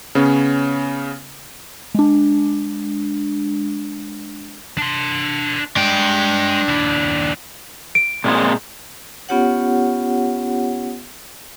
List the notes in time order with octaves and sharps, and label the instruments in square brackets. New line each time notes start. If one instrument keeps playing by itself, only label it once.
[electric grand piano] C#3 B3 C#4
[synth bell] G#3 D4
[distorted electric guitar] D4 C6
[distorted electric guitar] G#3 [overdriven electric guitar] D4 G5
[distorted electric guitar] D#2 E4
[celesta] D7
[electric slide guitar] A#2 G#3 C4
[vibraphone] B3 C#4 F4 G4 C#5 F#5